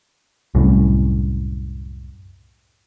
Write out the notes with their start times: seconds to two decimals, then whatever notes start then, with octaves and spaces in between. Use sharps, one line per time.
0.55 C2 F#2 A2